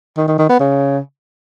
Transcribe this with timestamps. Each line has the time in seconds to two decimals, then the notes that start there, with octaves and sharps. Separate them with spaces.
0.17 D#3
0.28 D#3
0.38 D#3
0.49 B3
0.60 C#3